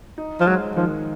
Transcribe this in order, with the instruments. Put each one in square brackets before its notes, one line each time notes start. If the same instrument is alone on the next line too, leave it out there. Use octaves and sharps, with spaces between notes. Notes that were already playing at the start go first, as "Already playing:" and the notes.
[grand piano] D#4
[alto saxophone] F3
[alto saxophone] F#3 [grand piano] G#3
[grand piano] D#3 [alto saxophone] F3